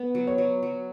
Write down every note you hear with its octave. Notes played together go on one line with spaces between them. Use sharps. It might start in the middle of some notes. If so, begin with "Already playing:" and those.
Already playing: B3
F#3
C#5
F#3
F#3